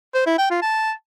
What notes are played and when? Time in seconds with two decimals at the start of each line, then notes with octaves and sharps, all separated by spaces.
0.14 C5
0.26 E4
0.38 G5
0.50 F4
0.62 A5